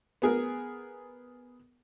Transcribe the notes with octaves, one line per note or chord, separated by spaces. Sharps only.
B3 G#4 A#4